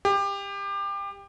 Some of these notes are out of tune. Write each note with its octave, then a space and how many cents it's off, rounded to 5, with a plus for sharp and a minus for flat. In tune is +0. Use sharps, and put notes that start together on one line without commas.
G4 +25